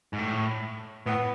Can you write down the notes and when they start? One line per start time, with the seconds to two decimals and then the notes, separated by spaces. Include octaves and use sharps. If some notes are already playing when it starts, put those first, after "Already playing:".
0.13 G#2
0.19 A2
1.06 A2 B3